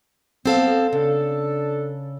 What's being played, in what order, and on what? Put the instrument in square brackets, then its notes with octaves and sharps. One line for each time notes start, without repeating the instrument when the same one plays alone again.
[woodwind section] B3 [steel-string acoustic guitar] C4 A4 F5
[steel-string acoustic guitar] C#3 [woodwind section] D4 A4